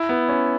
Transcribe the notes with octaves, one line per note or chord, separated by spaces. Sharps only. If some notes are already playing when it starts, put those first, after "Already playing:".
Already playing: E4
B3
C#4